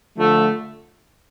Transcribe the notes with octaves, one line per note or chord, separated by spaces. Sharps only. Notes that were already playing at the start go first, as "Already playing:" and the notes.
D3 F3 A3